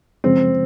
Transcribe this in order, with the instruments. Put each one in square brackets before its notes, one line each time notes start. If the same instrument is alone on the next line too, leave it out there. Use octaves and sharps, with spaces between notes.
[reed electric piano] F#2 C#3 F3 G#3 [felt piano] C4